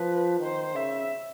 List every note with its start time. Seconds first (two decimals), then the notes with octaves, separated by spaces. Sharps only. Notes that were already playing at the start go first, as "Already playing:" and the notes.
Already playing: F3 B4
0.40 D#3 C5
0.75 C#3 E5